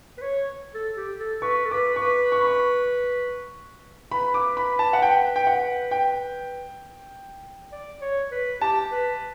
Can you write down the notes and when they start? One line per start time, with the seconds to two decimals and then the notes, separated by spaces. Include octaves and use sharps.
0.18 B4
0.22 C#5
0.74 A4
0.97 G4
1.19 A4
1.42 B4 C#6
1.65 A4
1.71 B4 D6
1.96 C#6
2.02 B4 D6
2.32 C#6
2.40 B5
2.47 C#6
4.11 B4 B5
4.34 D6
4.57 B5
4.79 A5
4.93 F#5
5.02 G5
5.36 G5
5.47 F#5
5.91 G5
7.72 D5
8.01 C#5
8.31 B4
8.61 G4 A5
8.91 B4